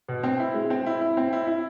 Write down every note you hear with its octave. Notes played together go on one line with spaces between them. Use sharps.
B2
C4
E4
G#3
C4
E4
E4
C4
E4
E4